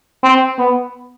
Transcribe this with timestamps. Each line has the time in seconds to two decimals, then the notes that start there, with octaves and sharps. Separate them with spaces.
0.23 C4
0.58 B3